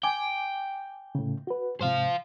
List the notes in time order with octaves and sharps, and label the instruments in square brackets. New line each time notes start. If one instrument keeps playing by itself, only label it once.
[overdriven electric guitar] G5 [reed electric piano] G#5 D6
[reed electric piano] A2 C#3
F#4 B4
[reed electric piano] G#2 C3 [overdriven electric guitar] C5 F5